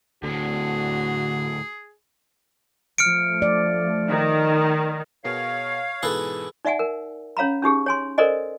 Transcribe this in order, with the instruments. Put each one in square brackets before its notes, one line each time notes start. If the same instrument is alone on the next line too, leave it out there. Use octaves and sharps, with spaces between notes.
[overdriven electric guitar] D2 A2 [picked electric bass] D3 [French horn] F#4 [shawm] G#4
[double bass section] F3 A3 [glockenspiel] F6 C#7 D7
[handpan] D5
[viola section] D#3
[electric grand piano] B2 G#4 A#4 [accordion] C#5 F5 [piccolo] C7
[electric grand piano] G#2 B2 E3 [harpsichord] G#4 A4 B4
[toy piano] D#4 D5 E5 F#5 G#5
A#4
C#4 C#5 F5 A#5 B5
C#4 D#4 G4 G#4
C#5 G#5 C6
A4 A#4 C5 D5 D#5 G#5